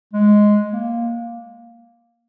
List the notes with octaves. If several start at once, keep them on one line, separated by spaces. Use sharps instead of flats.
G#3
A#3